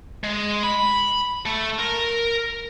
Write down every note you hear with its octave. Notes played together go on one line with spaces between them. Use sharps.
G#3
B5
A3
A#4